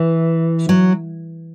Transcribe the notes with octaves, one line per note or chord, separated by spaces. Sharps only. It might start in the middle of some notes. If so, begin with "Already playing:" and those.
Already playing: E3
F#3